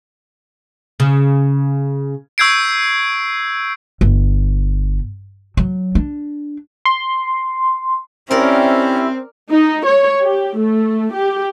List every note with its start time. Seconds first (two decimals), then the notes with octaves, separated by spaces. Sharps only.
1.00 C#3
2.38 C#6 E6 G6 G#6 C7 D7
4.01 G1
5.57 F#3
5.95 D4
6.85 C6
8.31 C4 C#4 E4 G4 A#4 D5 E5
9.51 D#4
9.85 C#5
10.24 G4
10.60 A3
11.15 G4